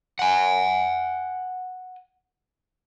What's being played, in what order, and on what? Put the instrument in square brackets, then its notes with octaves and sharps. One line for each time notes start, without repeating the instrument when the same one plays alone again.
[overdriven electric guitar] F#5 G#5